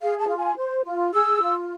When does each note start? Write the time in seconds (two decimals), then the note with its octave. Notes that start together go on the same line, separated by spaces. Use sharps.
0.01 G#4 F5
0.19 A5
0.28 F4
0.38 G#5
0.56 C5
0.84 F4
1.13 G#4 E6
1.41 F4